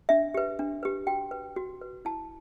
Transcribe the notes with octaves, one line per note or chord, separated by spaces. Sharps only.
D4 E5
G4 B4
D4
G4 B4
F#4 G5
B4
F#4
B4
E4 A5